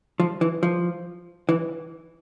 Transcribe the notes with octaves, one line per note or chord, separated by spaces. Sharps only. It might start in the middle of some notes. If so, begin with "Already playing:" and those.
F3
E3
F3
E3